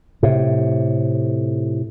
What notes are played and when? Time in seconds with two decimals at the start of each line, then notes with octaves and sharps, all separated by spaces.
0.23 A2 C3